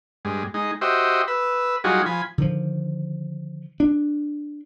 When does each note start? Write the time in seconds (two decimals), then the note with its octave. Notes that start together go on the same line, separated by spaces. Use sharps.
0.25 G2 G#3
0.54 G#3 D#4
0.81 F#4 G4 C5 D#5 E5
1.28 B4 E6
1.84 F#3 G3 D#4 F4 F#4 G#4
2.06 F3 G#5 B5
2.38 D3 D#3 F3
3.80 D4